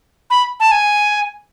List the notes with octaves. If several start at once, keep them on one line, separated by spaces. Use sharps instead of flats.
B5
A5
G#5